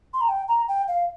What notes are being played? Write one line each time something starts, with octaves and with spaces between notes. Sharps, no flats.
C6
A#5
G5
A#5
G5
F5